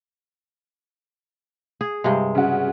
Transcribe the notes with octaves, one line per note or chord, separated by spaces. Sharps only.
G#4
G2 C3 G#3
C#3 F#4